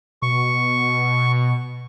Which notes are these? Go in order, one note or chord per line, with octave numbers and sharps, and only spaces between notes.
B2 C#6